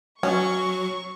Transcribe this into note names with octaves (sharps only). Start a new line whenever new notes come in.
F#3 C#4 C#6